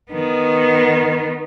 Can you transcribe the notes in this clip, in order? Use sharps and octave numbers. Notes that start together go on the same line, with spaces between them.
D#3 B3